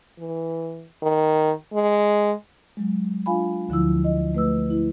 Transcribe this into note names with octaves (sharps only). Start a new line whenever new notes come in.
E3
D#3
G#3
F#3 G#3
D4 F4 F5 G#5 B5
D2 D3 F3 E4 E6
D#5
A3 B4 E6
E4